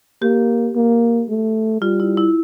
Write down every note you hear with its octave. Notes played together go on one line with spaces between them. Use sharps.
A#3 G4
A#3
A3
G3 F4
E4
E4